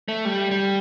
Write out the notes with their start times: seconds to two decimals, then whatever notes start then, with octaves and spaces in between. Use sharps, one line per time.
0.08 A3
0.25 G3
0.51 G3